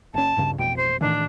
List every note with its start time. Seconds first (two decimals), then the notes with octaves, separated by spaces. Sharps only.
0.14 F#1 C#4 A5
0.37 D1 G2 C#3
0.58 A1 F2 B2 G5
0.77 C5
1.01 A2 D#3 E3 D4